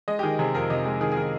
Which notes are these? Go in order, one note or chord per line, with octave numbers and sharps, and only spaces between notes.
G#3 D#5
G4
D#3 G#4
C3 G#4
F2 A#4
C3 D#5
G#3
D#3 G#4
G#4
D#3 A#4